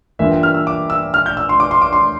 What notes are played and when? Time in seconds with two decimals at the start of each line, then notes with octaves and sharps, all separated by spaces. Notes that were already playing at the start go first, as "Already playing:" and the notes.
0.19 G2 E3 A#3 F4 E5
0.31 G5
0.43 F6
0.54 E6
0.67 D6
0.90 E6
1.14 F6
1.26 G6
1.37 E6
1.49 C6
1.60 D6
1.71 C6
1.82 D6
1.93 C6